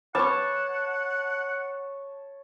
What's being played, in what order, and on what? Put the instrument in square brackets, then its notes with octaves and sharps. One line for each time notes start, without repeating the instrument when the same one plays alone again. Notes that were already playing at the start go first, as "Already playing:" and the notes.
[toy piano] B4 B5 D6 [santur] C#5 A5 [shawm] F#5